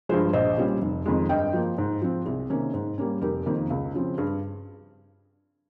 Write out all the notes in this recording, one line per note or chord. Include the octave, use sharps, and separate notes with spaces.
G2 F3 G#3 G#4 C5
A#1 C5 D#5
A#2 G3 C#4
F1
F2 D#3 G#3
G2 D#5 G5
F3 A#3
G#2
F3 C4
C2 G#4
C3 D#3 A#3 C#4
G#2
G3 A#3 C#4
F1 G4 A#4
F2 D#3 A#3
C#2
C#3 F3 C4
G2 G#4